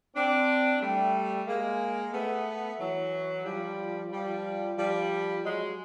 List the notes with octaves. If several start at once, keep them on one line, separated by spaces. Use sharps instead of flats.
C4 D4
G3 A3
G#3 A#3
A3 B3
E3 F#3
F3 G3
F3 G3
F3 G3
F#3 G#3